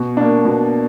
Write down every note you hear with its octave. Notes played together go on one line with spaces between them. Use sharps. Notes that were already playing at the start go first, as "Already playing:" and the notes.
Already playing: B2
A#3 D4
B2